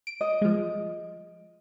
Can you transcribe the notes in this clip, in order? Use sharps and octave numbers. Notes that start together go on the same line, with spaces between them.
D7
D#5
F3 G#3